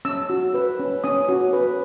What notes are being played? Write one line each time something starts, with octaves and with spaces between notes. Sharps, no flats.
C#4 E6
F#4
B4
C#4
C#4 D#6
F#4
B4